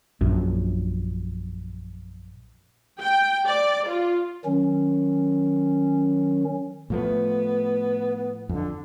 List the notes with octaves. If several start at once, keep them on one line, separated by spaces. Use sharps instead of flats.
A#1 F#2
G5
D5
F4
D#3 F#3 C#4
A2 F3 A3 B3
F2 D3